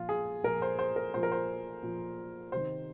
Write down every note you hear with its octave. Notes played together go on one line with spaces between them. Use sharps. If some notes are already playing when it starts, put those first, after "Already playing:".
Already playing: A#2 F3 F4
G#4
A#2 F3 A#4
C5
C5
A#4
A#2 F3 C5
A#4
C5
A#2 F3
C3 D#3 C5